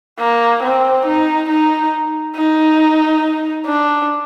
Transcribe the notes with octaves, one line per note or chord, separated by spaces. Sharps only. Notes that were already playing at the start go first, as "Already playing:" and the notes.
A#3
C4
D#4
D#4
D#4
D4